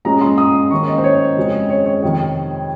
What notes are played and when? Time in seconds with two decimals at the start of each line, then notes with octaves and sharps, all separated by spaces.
0.05 A#2 G#3 C#4 A#5
0.21 C6
0.38 D#6
0.71 G#2 D#3 A#3 C#4 C#6
0.88 D#5
0.98 C5
1.04 C#5
1.37 F2 C#3 G#3 C4
1.70 C#5
1.86 C#5
2.03 F2 C3 D#3